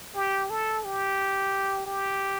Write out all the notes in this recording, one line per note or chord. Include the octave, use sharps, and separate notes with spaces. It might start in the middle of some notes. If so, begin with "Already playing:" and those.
G4
A4
G4
G4